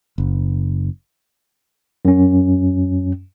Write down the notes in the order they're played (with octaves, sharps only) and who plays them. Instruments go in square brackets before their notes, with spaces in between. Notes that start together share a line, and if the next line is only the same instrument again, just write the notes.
[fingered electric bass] F#1
[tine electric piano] F#2 C#4